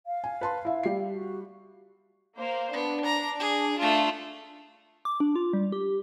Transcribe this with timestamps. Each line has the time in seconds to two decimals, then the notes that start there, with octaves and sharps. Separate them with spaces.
0.06 F5
0.24 G#5
0.41 B4 A5 C6
0.65 E4 E5
0.83 G3 C7
1.11 F#4
2.37 A#3 C5
2.73 B3 D4
3.05 A#5
3.39 G#4
3.79 A3 D4 F4
5.05 D6
5.20 D4
5.35 F4
5.53 G3
5.72 G4